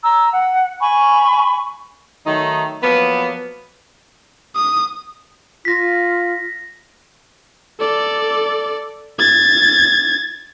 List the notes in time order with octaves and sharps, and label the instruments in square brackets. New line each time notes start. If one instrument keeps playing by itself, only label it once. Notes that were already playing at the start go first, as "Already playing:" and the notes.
[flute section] A#5 E6
F#5
G#5 B5 C#6
[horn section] D#3 F#3 A3 D#4
F3 F#3 A#3 B3
[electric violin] D#6
[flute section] F4 [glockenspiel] A#6 B6
[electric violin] A4 D5
G#6 A6